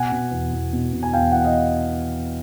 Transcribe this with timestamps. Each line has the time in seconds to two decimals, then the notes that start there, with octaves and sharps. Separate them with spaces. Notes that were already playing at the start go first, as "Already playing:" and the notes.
Already playing: B2 F#5 G#5
0.12 B2
0.31 E2
0.53 E2
0.73 B2
0.93 B2
1.03 G#5
1.13 E2 F5 G5
1.32 E2 F#5
1.44 D#5 F5